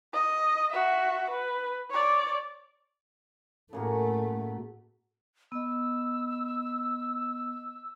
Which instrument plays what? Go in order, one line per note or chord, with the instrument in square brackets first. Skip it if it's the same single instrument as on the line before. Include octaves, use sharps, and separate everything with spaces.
[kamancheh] D#5
F#4 E5
B4
C#5 D5
[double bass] A2 A3 [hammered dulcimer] C#3 A#3 F#4
[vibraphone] B3 D#5 [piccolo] E6